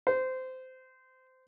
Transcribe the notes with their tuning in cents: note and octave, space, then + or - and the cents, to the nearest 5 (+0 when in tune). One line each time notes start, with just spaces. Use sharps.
C5 -20